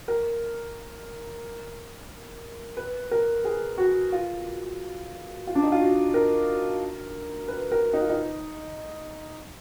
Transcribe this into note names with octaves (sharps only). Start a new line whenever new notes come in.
A#4
B4
A#4
G#4
F#4
F4
F4
D4
D#4
F4
F#4
A#4
B4
A#4
D#4
F4
D#4